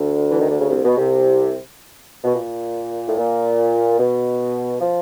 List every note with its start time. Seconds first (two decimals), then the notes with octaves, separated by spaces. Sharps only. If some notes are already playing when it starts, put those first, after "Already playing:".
Already playing: D2 D3
0.32 E3
0.42 D#3
0.51 D3
0.61 C#3
0.70 C2 C3
0.85 B2
0.98 C2 C3
2.24 B2
2.35 A#2
3.07 A2
3.17 A#2
3.99 B2
4.81 F3